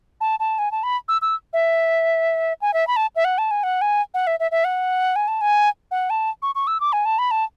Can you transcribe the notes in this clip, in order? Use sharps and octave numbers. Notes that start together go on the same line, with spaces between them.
A5
A5
G#5
A5
B5
E6
E6
E5
G#5
E5
B5
A5
E5
F#5
A5
G#5
F#5
G#5
F#5
E5
E5
E5
F#5
G#5
A5
G#5
F#5
A5
C#6
C#6
E6
D6
G#5
A5
B5
A5